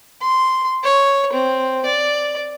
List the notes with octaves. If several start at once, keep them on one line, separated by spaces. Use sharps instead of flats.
C6
C#5
C4
D5